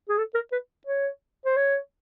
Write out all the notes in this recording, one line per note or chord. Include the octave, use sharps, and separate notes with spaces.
G#4
A4
A#4
B4
C#5
C5
C#5